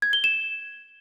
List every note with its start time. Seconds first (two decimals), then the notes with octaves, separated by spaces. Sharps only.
0.02 G#6
0.13 G7
0.24 E7